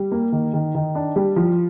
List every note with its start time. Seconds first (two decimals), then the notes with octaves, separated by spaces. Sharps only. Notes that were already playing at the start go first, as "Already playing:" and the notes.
Already playing: G3
0.12 A#3
0.32 D#3
0.54 D#3
0.75 D#3
0.95 D4
1.16 G3
1.36 F3